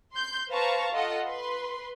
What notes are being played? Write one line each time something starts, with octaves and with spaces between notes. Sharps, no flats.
C6 G6
B4 C5 F5 A5 A#5 C#6
F4 A4 D#5 F#5
B4 C6